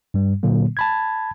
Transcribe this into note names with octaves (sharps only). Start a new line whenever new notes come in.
G2 G3
A#2 D3 F#3 A#3
A5 B5 G#6